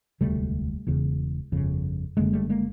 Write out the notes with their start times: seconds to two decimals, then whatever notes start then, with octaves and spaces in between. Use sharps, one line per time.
0.21 E1 D2 C3 G3 A3
0.87 E1 E2 C#3
1.52 G1 F2 C#3
2.17 F#1 F#2 D3 G#3 A#3
2.33 G3 A3
2.49 G#3 A#3